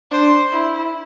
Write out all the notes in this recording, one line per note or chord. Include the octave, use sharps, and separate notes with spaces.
D4 C5
E4